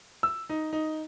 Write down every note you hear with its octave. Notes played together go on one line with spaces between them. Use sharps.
E6
D#4
D#4